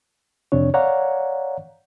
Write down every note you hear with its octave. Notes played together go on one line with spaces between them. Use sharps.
F2 C3 C4 D4 C#5
C#5 D5 F5 F#5 A#5